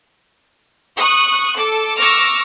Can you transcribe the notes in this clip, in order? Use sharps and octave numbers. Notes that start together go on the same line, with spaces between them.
C#6 D#6 F#6
A4 D6
C#6 D6 E6 F6 A#6